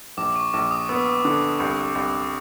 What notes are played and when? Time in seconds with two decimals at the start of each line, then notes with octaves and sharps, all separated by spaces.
0.17 A#1 D6
0.36 C#6
0.53 A#1 D6
0.71 D#6
0.89 B3 E6
1.25 D3
1.60 C2
1.95 C2